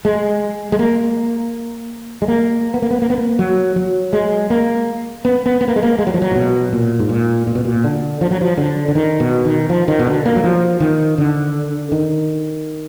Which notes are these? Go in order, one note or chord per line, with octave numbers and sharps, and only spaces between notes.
G#3
G#3
A#3
G#3
A#3
B3
A#3
B3
A#3
B3
A#3
F#3
F#3
G#3
A#3
B3
B3
B3
A#3
G#3
A#3
G#3
F#3
F3
F#3
A#2
B2
A#2
G#2
A#2
A#2
B2
A#2
D3
F3
F#3
F3
D3
D3
D#3
B2
D#3
F3
D#3
B2
D3
A#3
F#3
F3
D#3
D3
D#3